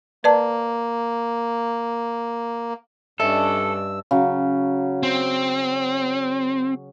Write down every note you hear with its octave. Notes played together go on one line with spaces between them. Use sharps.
A#3 B4 D5 A5
G2 C#4 D4 A4 D#5 E5 E6
C#3 F#3
C4